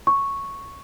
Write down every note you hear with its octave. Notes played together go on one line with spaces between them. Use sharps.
C#6